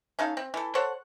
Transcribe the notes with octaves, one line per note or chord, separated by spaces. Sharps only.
C#4 D#4 A4 F5
C4
E3 A4
A4 C5 C#5 F#5